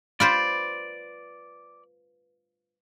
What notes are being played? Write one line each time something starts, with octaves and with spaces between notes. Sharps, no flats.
F4 B4 C5 D5